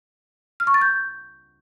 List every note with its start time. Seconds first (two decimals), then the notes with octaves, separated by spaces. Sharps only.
0.60 F6
0.67 C#6
0.74 A6
0.81 G6